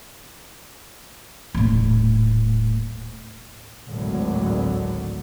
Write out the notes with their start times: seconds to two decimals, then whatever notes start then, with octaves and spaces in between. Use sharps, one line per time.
1.54 D#1 A2
3.86 G#1 D2 A2 D3 F#3